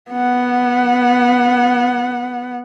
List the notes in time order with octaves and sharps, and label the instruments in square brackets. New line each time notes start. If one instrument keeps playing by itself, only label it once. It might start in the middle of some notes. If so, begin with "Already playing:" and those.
[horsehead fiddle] B3 F#5